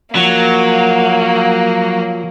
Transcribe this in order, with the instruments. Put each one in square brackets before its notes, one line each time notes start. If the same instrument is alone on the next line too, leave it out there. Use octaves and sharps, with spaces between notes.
[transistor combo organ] F3 [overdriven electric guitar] F#3 [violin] A#3